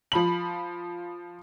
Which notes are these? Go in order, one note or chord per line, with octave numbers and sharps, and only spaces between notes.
F3 B5 F#7